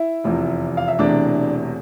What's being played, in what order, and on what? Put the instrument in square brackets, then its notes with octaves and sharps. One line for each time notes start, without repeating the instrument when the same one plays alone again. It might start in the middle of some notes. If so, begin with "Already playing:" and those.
Already playing: [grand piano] E4 E5
F1 E2 C3 F3
F5
E5
E1 E2 C3 E3 A3 D4 D5